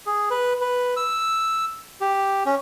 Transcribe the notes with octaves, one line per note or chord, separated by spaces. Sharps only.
G#4
B4
B4
E6
G4
C#4